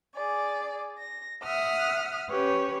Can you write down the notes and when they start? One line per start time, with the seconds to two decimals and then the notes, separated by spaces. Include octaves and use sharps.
0.15 G#4 D5
0.97 A#6
1.44 E5 F#5 D#6 F6
2.30 C#4 G4 B4 C#5